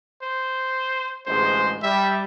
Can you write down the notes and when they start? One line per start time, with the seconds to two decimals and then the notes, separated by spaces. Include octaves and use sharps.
0.22 C5
1.26 A1 D2 G#3 C5
1.82 G3 E5